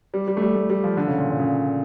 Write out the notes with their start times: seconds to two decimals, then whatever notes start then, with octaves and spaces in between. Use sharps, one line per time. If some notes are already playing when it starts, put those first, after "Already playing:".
0.14 G3
0.28 G3
0.37 A3
0.42 G3
0.55 A3
0.70 G3
0.84 F3
0.97 D3
1.07 C#3
1.18 A#2
1.29 A#2
1.40 C#3